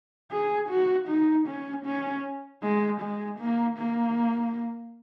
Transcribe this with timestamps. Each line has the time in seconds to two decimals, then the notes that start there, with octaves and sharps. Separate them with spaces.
0.32 G#4
0.69 F#4
1.08 D#4
1.47 C#4
1.86 C#4
2.63 G#3
3.01 G#3
3.39 A#3
3.78 A#3